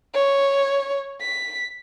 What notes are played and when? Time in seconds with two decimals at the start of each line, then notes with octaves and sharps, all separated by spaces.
0.14 C#5
1.21 B6